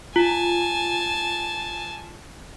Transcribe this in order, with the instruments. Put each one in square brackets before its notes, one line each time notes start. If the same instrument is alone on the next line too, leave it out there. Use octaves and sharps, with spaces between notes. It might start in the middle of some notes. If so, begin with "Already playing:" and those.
[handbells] F4 [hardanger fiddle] G#5 A5